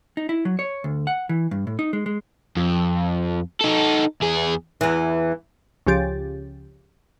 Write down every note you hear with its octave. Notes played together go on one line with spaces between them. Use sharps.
D#4
E4
F#3
C#5
D2
F#5
E3
G2
A2
D#4
G#3
G#3
F2
D#4 A4
E2 G#4
E2 E3
C#2 C#3 F3 G4 A6